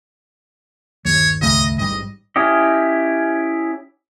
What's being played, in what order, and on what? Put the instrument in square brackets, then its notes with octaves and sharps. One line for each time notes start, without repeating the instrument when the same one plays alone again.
[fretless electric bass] G1 D#2 [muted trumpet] C#5
[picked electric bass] C#2 C#3 A3 [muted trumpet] D#5
[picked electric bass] A1 G#2 G3 [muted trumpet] D#5
[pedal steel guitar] C#4 E4 G4 D#5